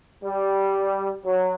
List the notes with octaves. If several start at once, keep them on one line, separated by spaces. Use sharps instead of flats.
G3
F#3